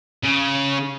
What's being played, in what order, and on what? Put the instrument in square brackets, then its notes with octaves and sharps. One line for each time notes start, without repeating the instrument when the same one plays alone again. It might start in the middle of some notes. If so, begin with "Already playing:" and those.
[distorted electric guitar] C#3